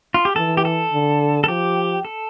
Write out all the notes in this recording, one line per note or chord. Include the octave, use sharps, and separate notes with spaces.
F4
G4
E3 A4
G4
A4
D3
A4
F3 G4
A4